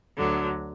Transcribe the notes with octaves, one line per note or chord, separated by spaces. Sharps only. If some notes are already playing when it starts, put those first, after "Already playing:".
D2 D3 F#3 A4